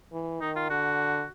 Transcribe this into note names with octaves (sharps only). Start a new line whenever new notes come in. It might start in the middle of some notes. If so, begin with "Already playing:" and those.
E3
D#3 D#4
F4
D3 F#4